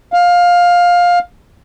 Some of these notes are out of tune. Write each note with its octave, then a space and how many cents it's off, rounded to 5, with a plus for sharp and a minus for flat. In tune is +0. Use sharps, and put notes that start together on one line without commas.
F5 +15